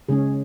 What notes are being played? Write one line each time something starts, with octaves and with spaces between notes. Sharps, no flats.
C#3 G#3 C#4 G#4